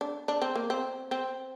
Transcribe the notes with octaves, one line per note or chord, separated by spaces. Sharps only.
D4
D4
C4
A#3
C4
C4